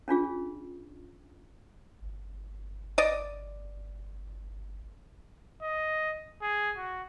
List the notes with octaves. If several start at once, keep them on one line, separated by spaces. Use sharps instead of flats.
C#4 D4 F4 G#4
G1
D5 D#5
D#5
G#4
F#4